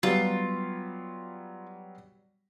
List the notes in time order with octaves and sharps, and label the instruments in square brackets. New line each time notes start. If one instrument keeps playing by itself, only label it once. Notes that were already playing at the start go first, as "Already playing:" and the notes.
[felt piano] F#3 G3 B3 [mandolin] F4